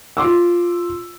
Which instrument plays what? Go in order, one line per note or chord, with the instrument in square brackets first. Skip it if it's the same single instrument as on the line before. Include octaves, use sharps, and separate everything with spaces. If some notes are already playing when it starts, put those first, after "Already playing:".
[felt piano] F4 C6 D6 E6